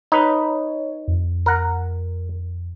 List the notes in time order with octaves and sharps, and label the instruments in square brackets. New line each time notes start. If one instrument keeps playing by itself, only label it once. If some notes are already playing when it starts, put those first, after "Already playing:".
[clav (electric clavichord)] D#4 B4 [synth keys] C#5
[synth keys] F2
[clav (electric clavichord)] A#4 F#5